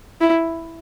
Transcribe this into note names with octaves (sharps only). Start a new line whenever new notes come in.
E4